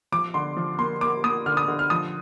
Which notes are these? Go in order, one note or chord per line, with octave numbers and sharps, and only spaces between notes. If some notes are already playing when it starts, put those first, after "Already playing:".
F3 D6
D3 C6
F3
A#3 C6
A#3 D6
A#3 D#6
D3 F6
D#6
D3
F6
F3 D#6